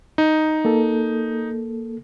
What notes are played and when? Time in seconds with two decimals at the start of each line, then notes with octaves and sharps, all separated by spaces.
0.18 D#4
0.65 A#3 A4